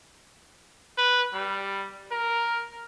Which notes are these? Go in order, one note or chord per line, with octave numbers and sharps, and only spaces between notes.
B4
G3
A#4